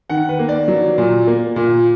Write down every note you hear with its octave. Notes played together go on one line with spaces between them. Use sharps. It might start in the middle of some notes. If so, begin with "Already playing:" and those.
D#3 F#5
B4
A#3
D5
F#3
A#2
A#3
A#2